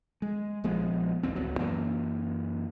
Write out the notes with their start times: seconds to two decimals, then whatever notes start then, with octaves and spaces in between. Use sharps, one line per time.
0.22 G#3
0.64 A#1 F3 G#3 B3
1.23 G#1 D#2 C4
1.35 D1 C#2 F#3 B3
1.59 F#2 E3 A#3